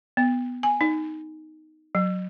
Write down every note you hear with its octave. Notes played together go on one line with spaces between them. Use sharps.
B3
G#5
D#4
F#3